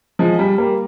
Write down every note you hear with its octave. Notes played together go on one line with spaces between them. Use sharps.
F3 G#3
G3
G3 A#3